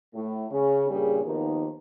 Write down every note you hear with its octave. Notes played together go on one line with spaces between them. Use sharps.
A2
C#3 C#4
G2 A#2 C#3 G3 C#4 G#4
D#2 D#3 F3 B3 D#4